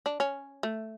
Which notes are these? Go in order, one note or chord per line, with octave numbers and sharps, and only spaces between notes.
D4
C#4
A3